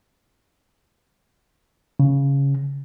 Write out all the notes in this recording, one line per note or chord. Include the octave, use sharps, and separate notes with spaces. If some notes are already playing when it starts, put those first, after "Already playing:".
C#3